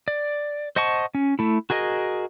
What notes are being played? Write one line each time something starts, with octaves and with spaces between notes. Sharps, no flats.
D5
C5 D#5 F#5 A5 C#6
C#4
A3 E4
F#4 G#4 A#4 D#5